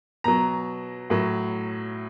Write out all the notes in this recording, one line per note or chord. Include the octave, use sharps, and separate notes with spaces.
B2 F#3 A#5
A2 F#3